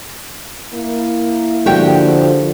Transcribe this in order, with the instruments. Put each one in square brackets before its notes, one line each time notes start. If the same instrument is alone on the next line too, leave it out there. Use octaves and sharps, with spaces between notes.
[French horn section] A#3 E4
[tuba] D3 [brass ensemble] F3 [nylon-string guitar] F#4 G4 G5